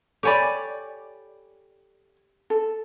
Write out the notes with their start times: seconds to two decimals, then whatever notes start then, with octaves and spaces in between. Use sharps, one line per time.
0.23 G4 A4 C#5 D5 G#5 B5
2.50 A4